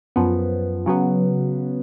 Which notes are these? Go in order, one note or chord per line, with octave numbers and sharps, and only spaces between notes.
F#2 F3 B3
C#3 F#3 B3